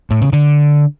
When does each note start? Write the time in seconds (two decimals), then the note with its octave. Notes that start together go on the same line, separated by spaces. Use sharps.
0.10 A2
0.22 C#3
0.33 D3